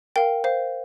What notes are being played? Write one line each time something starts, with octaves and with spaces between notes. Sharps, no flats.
A#4 F5 G5
C5 F5